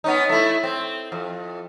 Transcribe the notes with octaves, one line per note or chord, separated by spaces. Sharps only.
B3 C#4 D#4
A3 E4
C4
F2